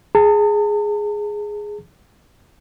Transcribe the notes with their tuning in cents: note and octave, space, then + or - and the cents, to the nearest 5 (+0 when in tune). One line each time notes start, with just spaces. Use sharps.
G#4 +0 A5 +45